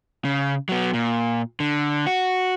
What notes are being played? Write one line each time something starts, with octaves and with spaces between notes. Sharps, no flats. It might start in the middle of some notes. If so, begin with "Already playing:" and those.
C#3
F#3 B3
A#2
D3
F#4